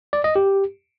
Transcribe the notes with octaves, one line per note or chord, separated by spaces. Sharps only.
D5
D#5
G4